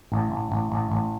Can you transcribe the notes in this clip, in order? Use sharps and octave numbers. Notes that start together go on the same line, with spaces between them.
A1
A1
A1
A1
A1